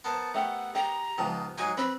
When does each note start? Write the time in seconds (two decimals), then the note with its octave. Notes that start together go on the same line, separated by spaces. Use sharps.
0.04 B3 A#4 C5 A5
0.34 A3 G4 F#5
0.75 G4 A#5
1.18 C#2 G#2 F3 B3 G4 A5
1.58 G#2 F#3 G#3 G#5
1.77 C4 B4 B5